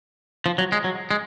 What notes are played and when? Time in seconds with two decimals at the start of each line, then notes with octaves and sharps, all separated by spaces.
0.46 F3
0.58 F#3
0.72 G#3
0.84 F#3
1.11 G#3